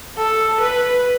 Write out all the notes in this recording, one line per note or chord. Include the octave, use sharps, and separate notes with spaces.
A4
B4